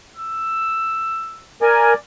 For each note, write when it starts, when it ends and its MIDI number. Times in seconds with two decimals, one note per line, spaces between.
0.17 1.47 88
1.62 1.94 70
1.62 1.98 74
1.62 1.94 80